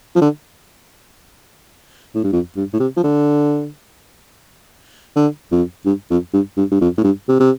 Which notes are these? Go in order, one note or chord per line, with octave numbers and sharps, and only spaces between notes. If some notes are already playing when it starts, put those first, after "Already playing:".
F3
D3
A2
G2
F2
G2
A2
C3
F3
D3
D3
F2
G2
F2
G2
G2
G2
F2
A2
G2
C3
C3